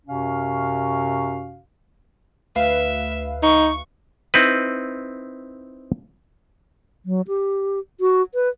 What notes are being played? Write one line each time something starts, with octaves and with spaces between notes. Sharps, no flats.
F#2 C3 C#4 F#4 F5
D2 B4 E5 F5
D#4 C#6
C4 D#4 E4 B4
F#3
G4
F#4
B4